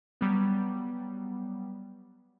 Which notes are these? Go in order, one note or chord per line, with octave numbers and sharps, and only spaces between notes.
F#3 G3 B3